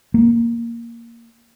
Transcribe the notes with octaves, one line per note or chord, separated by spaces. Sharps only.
A#3